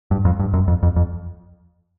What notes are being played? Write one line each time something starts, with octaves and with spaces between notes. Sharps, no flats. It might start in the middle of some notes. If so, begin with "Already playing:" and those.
G2
F2
G2
F#2
F2
F2
F2